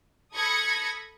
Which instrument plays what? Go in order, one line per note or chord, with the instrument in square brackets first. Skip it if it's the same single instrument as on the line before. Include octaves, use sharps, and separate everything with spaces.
[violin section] A4 B5 D#6 G#6 A#6 C#7